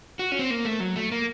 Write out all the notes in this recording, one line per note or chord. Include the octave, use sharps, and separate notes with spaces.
F#4
C#4
C4
A#3
A3
F#3
A3
A#3